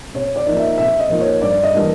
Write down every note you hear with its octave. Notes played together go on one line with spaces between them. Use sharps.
C3 C#5
D5
F3 A#3 D#4
E5
C3 E5
D#5
F3 A#3 D#4
C#5
G2 D5
D#5
E3 G3 A#3 D4